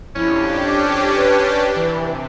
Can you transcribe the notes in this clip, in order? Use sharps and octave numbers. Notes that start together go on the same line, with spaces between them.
F2 C#4 D4 E4 G4
D6
B4
C3 E3